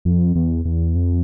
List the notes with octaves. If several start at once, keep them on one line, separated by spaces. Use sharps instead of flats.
F2
E2
E2
F2